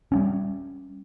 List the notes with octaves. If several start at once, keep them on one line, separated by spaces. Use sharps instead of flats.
G3 B3 C#4